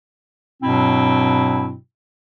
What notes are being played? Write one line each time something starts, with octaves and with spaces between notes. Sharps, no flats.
G2 B2 F#3 C4 E4